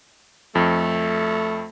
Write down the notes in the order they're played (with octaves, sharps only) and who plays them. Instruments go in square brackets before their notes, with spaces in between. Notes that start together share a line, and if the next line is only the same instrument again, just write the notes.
[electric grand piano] F2 [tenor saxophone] A3